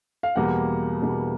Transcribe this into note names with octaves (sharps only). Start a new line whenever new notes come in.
F5
E2 B2 G3 A#3 F#5
E2 B2 G3 A#3